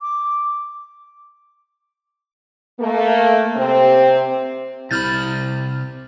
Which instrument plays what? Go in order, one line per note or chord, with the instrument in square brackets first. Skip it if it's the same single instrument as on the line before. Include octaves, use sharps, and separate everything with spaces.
[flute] D6
[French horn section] A3 A#3
C3 C4
[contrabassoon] C2 [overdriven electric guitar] C3 B5 [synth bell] F6 G6 A6